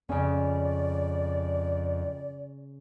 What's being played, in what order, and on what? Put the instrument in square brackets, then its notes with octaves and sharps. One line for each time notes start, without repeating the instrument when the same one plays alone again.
[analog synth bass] F2 [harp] C#3 C#4 [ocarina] D5